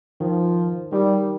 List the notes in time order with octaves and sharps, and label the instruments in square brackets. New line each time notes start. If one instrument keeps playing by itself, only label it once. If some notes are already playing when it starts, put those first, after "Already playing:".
[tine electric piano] D#3 [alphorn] F3
[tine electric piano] D#3 [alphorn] G3